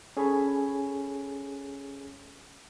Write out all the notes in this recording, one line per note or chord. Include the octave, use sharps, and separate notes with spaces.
C#4 G#4 A4 C#5 G#5 B5